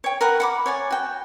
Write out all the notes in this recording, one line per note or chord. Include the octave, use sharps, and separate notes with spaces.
C#5 G5
A#4 B4 F#5
F#5 B5 D6
C#5 D5 G#5
F#4 G5